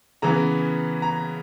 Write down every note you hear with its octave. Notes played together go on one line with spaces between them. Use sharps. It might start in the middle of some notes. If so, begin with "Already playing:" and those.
C#3 E3 B3 A#5
A#5